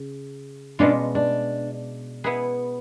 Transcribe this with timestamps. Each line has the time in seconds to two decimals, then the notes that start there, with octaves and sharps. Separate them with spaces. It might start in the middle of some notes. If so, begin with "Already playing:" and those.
Already playing: C#3
0.79 B2 G#3 C#4 D4 F4
1.15 D4
2.24 B3 E4 G#4 B4